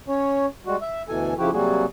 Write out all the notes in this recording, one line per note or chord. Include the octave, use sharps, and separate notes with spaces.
C#4 C#5
G3 G#3 F#4
E5
D2 B2 E3 A4 G#5
F2 C#3 F3 E4 F#4 G4
C3 F#3 G3 A#3 F#4 G#4